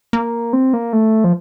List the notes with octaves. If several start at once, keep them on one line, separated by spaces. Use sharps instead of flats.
A#3
C4
A#3
A3
F3